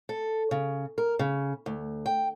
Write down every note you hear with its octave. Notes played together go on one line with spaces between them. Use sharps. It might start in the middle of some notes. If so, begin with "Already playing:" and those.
A4
C#3
A#4
C#3
D2
G5